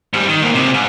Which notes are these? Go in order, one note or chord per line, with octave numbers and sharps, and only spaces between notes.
G#2 G3
D#3
G#2 A#3
C#2 C3
G#2